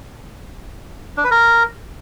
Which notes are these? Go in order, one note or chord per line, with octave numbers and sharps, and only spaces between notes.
D4
B4
A#4